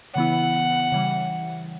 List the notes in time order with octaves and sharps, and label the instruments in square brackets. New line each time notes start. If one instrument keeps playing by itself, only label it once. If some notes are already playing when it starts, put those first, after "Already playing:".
[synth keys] C#3 E3 B3 E4 [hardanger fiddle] F#5
[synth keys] C#3 E3 G3